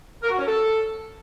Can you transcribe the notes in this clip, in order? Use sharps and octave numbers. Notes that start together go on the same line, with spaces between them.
A#4
F#4
C#4
A4